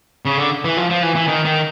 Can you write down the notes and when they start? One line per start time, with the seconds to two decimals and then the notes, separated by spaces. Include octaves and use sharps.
0.25 C#3
0.38 D3
0.64 E3
0.77 F3
0.90 F3
1.03 E3
1.15 E3
1.28 D#3
1.45 D#3